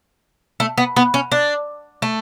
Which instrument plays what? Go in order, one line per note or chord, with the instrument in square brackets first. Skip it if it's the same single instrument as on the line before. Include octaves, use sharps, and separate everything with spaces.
[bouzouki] A3
B3
B3
C#4
D4
A3